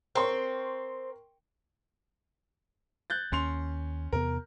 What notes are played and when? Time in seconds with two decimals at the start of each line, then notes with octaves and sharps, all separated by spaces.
0.15 C4 A#4 C6 C#6
3.10 F#6 G6 A6
3.32 D#2 C#4 C6 F7
4.13 E2 C3 B3 A#4